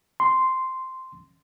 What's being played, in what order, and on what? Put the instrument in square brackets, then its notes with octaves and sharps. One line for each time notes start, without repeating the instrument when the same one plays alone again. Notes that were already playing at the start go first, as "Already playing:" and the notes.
[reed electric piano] C6